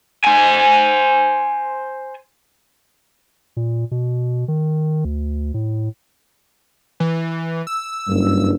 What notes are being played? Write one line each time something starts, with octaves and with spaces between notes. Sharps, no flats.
C5 G#5
A#2
B2
D#3
D2
A2
E3
E6
F#1 G2